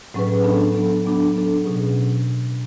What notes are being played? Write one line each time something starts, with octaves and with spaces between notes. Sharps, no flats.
A2 F#3 C#4 G#4 B4
F#3 B3 D4 A4
F#3 B3 D4 A4
F#3 B3 D4 A4
F#3 B3 D4 A4
B2 F#3 C#4 G#4